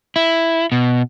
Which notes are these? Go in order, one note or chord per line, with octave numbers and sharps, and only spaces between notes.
E4
B2